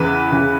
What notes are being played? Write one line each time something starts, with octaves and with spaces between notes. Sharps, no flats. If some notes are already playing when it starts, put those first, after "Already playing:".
Already playing: E2 C#3 E3 B4
E2 C#3 E3